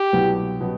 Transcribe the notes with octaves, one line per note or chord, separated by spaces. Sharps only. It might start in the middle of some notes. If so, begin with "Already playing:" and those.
Already playing: G4
C2 B2 F#3 B3
B2 F#3 B3